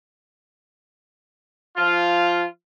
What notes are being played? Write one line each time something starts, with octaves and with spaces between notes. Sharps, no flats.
F3 F4